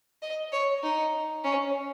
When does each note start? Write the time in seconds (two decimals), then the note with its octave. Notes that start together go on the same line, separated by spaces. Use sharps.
0.22 D#5
0.52 C#5
0.83 D#4
1.44 C#4